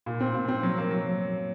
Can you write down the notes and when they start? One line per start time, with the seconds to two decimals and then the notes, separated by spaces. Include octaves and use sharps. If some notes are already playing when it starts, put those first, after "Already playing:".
0.06 A#2
0.21 C4
0.34 A#2
0.48 C4
0.63 F#3
0.78 A#3
0.91 F#3